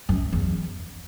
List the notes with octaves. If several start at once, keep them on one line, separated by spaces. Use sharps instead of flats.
F#2
E2